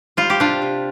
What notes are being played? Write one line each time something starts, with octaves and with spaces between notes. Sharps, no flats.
G3 F4
G4
C3 D4 F4
C3